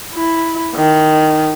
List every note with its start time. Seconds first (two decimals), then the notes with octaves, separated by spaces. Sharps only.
0.14 E4
0.75 D#3